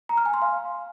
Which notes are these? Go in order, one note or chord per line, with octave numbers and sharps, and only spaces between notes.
A#5
F6
G#5
C6
F5